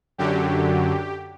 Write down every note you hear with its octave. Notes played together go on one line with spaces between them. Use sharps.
F#2 D3 F#3 G4